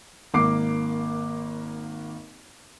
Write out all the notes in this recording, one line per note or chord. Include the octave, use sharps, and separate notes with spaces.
G#1 A#3 D6 C7